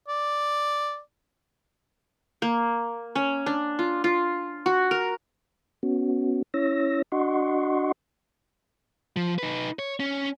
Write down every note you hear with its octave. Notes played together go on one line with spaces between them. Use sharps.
D5
A#3
C#4
D4
F4
F4
F#4
A#4
B3 C#4 F#4
C#4 E4 C#5 E6 A#6
D4 F#4 D#5 F#5 C6 C#6
F3
D#4 B4
C#5
C#4